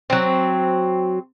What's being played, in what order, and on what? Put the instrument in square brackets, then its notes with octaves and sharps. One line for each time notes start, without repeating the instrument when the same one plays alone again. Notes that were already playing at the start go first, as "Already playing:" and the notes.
[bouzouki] F#3 C4